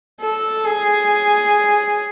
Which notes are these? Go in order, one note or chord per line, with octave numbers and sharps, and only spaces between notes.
A4
G#4